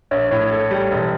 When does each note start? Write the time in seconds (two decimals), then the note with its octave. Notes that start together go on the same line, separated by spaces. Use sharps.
0.11 A#1 C#5
0.31 A2 C#5
0.51 A4
0.71 G3
0.91 E1